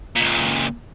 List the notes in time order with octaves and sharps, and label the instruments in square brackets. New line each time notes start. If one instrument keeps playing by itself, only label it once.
[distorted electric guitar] C#2 A#2